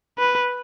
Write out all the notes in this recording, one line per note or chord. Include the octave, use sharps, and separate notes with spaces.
B4